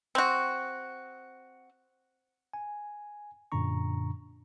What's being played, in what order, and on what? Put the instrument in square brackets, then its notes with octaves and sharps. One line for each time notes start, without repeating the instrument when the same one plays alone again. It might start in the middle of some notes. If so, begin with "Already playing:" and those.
[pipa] C4 F#4
[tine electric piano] G#5
F#2 A#2 D3 D4 A#5 C#6